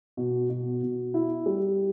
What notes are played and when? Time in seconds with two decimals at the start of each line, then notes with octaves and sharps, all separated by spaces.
0.17 B2
0.50 B2
0.82 B2
1.14 E4
1.46 G3